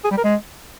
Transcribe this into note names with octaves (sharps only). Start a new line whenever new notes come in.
G#4
G3
A#4
G#3